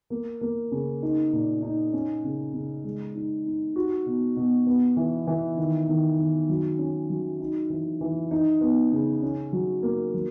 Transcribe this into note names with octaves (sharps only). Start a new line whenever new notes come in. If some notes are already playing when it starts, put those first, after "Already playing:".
A#3
A#3
C#3
D#4
A#2
D#4
C#4
C#3
C#3
G#3
D#4
D#4
F#4
B2
B2
B3
E3
E3
D#3
D#3
D#3
F#3
C#4
F#3
D#4
E3
E3
D#4
B3
C#3
C#4
F#3
A#3
F#3